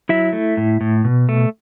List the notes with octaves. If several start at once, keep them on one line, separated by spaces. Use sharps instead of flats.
F#3 E4 E5
A3
A2
A2
B2
A3